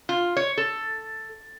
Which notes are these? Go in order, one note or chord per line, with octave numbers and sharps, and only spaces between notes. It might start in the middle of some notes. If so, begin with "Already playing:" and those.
F4
C#5
A4